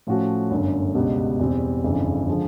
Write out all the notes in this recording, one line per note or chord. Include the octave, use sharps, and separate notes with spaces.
A2 F3 A3 C#4 F#4
G1 F#2 D3
C#2 B2 G3
E2 B2 G3 C4
G1 F2 C#3 E3
D3 F3 G#3